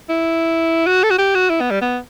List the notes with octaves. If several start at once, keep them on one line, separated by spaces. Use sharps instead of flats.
E4
F#4
A4
F#4
G4
F#4
E4
B3
G3
B3